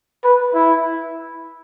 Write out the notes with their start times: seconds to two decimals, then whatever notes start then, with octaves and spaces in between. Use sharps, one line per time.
0.24 B4
0.54 E4